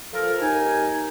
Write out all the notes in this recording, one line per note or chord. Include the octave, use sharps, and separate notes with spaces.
F3 A4 A#4
D#2 D#4 G#5